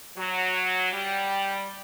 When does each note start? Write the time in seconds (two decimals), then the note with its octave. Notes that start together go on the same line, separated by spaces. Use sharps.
0.18 F#3
0.92 G3